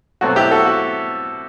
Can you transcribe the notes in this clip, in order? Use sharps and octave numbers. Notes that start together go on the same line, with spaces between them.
B2 F#3 A3 C4 F#4
E4 G4
F#4 A4
F#4